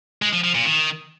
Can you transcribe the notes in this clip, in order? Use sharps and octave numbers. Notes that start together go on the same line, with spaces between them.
G#3
F3
F3
A#2
D#3